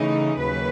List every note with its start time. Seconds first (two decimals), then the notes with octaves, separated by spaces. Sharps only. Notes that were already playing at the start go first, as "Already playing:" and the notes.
Already playing: C#3 E3 A3 D#4
0.40 D#2 C#3 F#3 B4